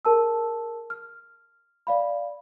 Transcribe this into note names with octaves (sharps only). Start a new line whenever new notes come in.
G#4 A#4 A5 E6
F6
D5 F5 B5